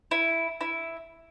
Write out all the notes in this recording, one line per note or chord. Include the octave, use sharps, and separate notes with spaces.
E4
E4